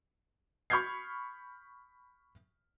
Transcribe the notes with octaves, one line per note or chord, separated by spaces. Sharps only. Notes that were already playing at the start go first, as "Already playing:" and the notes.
B5 C#6 F6 G6 G#6 C7